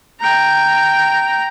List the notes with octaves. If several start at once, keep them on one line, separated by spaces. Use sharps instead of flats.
G5 A#5